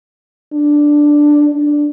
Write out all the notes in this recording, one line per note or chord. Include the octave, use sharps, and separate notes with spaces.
D4
D4